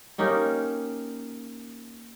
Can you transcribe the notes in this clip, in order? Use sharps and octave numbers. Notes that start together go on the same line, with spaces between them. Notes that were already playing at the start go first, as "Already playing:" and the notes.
A#3 C#4 D#4 G4